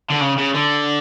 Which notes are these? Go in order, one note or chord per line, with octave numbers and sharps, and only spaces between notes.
D3
C#3
C#3
D3